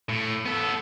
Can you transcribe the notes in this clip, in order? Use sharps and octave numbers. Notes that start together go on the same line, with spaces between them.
A2
B3 A4